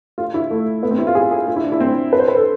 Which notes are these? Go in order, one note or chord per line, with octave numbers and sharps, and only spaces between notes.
F4
E4
A3
B3
C4
E4
F4
G#4
G#4
F4
E4
D4
E4
C4
B4
C5
B4
A4